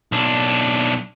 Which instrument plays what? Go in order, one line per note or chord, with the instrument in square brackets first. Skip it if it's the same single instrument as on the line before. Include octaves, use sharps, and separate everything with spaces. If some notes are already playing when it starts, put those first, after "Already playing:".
[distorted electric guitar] B1 D4